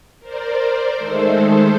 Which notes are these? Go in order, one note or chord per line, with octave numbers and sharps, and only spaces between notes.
A#4 C5 D5
D#3 G#3 A3 A4 C5